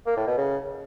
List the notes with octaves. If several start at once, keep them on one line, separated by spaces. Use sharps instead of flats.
A#3
A2
B2
C#3